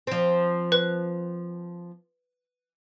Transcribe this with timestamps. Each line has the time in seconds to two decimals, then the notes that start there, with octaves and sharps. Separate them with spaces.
0.07 F3 C4
0.72 B4 F#6